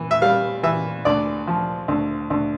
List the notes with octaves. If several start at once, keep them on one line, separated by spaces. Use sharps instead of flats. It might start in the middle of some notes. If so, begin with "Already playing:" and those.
Already playing: E3
E5
G3 F5
E3 E5
D2 D5
F3
D2
D2